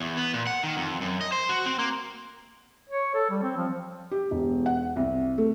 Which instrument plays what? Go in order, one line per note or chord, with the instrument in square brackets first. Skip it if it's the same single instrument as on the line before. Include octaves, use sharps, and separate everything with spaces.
[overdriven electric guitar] E2
B3
A#2
F#5
D#3
F2
F#2
D#5
C5
F#4
C4
A#3
[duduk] C#5
A4
G3
C4
F3
[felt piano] G4
E1
F#5
C2
A3